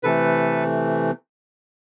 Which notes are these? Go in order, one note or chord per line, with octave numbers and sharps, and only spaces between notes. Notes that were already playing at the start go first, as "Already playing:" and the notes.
C3 E3 A3 A4 B4